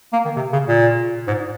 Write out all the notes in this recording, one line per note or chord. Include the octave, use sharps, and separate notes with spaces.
A#3
D#3
C3
C#3
A#2
G#2